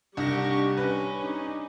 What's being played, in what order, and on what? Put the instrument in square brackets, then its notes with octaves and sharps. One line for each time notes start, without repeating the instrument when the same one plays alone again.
[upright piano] C2 [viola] G3 D#4 [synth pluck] D4 A#6 [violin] G4 C#6
[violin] C#4 [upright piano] B4
[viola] D4 D#4